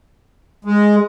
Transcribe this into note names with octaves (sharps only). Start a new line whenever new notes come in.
G#3